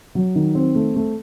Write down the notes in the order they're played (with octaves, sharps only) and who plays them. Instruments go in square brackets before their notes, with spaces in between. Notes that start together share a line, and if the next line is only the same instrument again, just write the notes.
[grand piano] F#3
D#3
C4
A3
A3